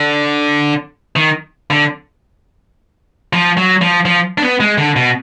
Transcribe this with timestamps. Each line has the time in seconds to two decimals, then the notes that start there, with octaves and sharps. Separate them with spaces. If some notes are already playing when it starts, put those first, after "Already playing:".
Already playing: D3
1.16 D#3
1.70 D3
3.33 F3
3.57 F#3
3.81 F3
4.05 F3
4.38 D4
4.42 B3
4.60 G#3
4.78 D3
4.96 B2